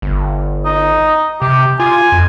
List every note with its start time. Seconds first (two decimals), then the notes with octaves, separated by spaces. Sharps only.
0.02 G1
0.65 D#4
1.42 C3 G4
1.80 F4 G#5
2.12 F2